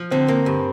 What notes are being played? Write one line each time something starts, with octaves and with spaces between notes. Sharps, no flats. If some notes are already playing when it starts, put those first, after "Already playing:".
Already playing: F3
D3 C4
A#3
G2